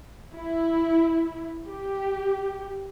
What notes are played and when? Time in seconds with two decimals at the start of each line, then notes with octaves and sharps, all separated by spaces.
0.35 E4
1.67 G4